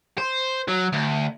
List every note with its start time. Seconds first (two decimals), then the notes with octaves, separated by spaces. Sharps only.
0.18 C5
0.68 F#3
0.93 D2